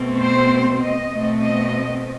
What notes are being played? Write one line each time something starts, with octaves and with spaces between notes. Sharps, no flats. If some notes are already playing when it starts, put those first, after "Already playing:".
Already playing: B2 A3 C4
C5
D#5
B2 A3 C4
D#5